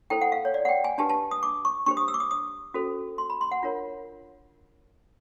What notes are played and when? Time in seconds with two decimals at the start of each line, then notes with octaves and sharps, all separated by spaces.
0.10 E4 A4 C5 G5
0.21 F#5
0.32 F5
0.45 C#5
0.54 D5
0.65 F#5
0.69 G5
0.84 G#5
0.98 D4 G4 B4 A5
1.10 A5
1.31 D#6
1.43 D6
1.65 C#6
1.86 D4 G4 C5 C#6
1.97 D#6
2.08 E6
2.14 D6
2.20 D#6
2.31 D#6
2.74 C#4 F#4 A4 C5
3.18 C6
3.30 B5
3.41 C6
3.51 F#5
3.62 D4 F4 A#4 C#5